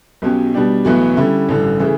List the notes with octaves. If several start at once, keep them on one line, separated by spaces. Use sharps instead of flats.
B1 B2 F#3 C#4 G4
B2 G3 D4 G4
B1 A2 E3 B3 F#4
D3 G3 C#4 E4
A1 G2 D3
C#3 E3 A3